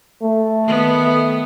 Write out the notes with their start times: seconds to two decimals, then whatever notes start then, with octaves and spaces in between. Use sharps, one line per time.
0.22 A3
0.65 D#3 B3